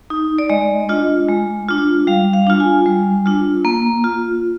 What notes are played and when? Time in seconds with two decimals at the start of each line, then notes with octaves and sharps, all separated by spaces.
0.10 D#4
0.38 D5
0.49 G#3 D#5
0.89 D4 F4
1.29 G#3
1.69 D4 F4
2.07 G3 F5
2.33 F5
2.47 D4 F4
2.60 G#5
2.86 G3
3.26 D4 F4
3.65 A#3
4.04 F4